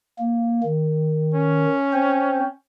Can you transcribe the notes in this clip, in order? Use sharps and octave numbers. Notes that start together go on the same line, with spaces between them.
A#3
D#3
C#4
C4 C5